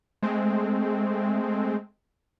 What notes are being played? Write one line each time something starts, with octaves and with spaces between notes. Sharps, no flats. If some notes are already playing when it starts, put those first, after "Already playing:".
G#3 A3 C4